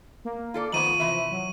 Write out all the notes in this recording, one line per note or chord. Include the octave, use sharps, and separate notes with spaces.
A#3
F4 A4 D5
D#3 F3 A3 B3 C#6 D#7 F#7
C3 E3 E5
F#3